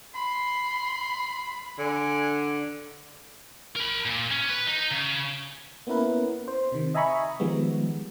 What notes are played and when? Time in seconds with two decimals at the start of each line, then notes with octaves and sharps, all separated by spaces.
0.14 B5 C6
1.79 D3 G#5
3.76 A#4 B5
4.06 A#2
4.31 C#4
4.49 B4
4.67 D#4
4.91 C#3
5.87 A#3 B3 C#4 E4 A#4 B4
6.48 C5
6.72 C3 D#3
6.94 D#5 E5 G#5 A#5 B5 C#6
7.40 D#3 F3 G3 G#3 B3